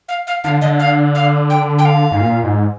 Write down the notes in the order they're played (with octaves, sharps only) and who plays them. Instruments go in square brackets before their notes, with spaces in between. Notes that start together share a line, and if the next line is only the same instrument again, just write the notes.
[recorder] F5
F5
[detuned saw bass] D3 [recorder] F5
[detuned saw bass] D3 [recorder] D#5
[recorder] F5
F5
G5
G5
F5
[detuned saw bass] G#2
A#2
G#2